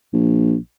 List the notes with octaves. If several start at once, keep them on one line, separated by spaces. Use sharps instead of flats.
A#1